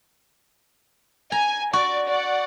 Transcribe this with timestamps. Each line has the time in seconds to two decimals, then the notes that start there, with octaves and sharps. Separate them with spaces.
1.32 G#5 A#5
1.73 F#4 D5
2.08 D5 F#5